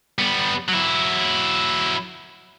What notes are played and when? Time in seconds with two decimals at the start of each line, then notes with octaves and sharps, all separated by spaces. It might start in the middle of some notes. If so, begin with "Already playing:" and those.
0.19 G3 B3
0.69 F#3 E4